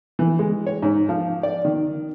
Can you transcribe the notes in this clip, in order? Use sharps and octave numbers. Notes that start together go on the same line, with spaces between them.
E3
G#3
C#5
G#2
F3
D5
D#3